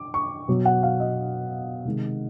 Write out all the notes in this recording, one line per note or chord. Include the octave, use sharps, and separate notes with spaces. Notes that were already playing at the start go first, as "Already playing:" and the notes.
Already playing: D6
C#6
B2 F#3
F#5
F5
D#5
C3 D#3 G#3